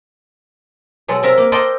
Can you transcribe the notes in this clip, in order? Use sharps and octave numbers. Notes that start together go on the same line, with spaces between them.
B2 F#3 G#3 A4
C3 A#4 E5 A#5
A#3
A4 A#4 C5 D5 D#5 G5